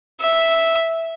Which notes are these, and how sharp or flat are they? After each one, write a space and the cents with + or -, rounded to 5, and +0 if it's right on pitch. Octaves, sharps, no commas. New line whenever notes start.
E5 +0 E6 -10